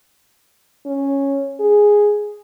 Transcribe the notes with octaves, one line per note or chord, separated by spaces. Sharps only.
C#4
G#4